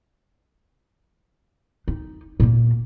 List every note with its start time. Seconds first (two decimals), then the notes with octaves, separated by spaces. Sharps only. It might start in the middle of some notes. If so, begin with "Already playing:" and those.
1.88 D#4
2.40 A#2 A#3